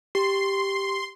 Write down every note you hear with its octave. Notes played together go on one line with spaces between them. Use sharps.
G4 C6